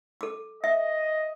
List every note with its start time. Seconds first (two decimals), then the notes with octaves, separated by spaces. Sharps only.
0.21 A4 D6
0.64 D#5 E5